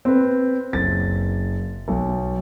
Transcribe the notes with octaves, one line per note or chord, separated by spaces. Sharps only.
C4 B4
F#1 A6
B1